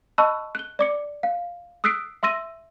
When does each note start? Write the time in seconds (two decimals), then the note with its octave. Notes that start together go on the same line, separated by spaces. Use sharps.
0.18 D#5 A5 B5 C#6 E6 F#6
0.55 F#6 G7
0.79 D5 D6 C#7
1.23 F5
1.84 D#6 E6 F#6 B6 C7 D7
2.23 E5 C6 E6 A#6 D#7